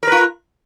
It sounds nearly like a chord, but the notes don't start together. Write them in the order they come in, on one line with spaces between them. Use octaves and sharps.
A#4 B4 F4